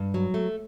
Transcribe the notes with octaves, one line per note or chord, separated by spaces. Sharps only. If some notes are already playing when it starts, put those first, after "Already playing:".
Already playing: G2
F#3
A3